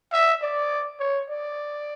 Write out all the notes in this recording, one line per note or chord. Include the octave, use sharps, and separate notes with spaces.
E5
D5
C#5
D5